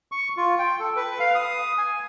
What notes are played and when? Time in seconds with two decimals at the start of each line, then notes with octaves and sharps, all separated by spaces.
0.12 C#6
0.37 F4
0.59 G5
0.80 A4
0.96 B4
1.20 F5
1.35 D#6
1.78 G#5